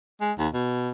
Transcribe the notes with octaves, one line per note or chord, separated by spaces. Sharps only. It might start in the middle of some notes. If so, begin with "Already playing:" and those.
G#3
D#2
B2